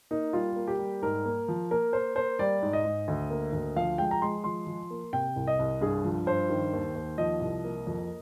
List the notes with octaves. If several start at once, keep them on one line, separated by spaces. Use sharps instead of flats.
A#3 D#4
G3 F4
A#3
G4
G3
G#2 A#4
A#3
F3
A#3 A#4
A#3 C5
A#3 C5
G3 D5
G#2
D#5
G#2
D2
A#3
D2
F3 F5
G#3 G5
A#5
G#3 C6
F3 C6
F3
A#3
C3 G5
C2
D#5
C2
G2 G#4
F3
G2 C5
D#3
D#2
D#2
F3 D#5
C2
A#3
F2